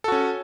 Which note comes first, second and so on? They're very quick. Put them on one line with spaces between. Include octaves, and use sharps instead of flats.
A4 F#4 C#4